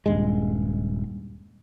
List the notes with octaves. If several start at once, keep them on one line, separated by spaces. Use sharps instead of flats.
D#1 G2 G#3